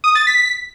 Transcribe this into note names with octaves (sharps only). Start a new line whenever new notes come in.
D#6
A6
B6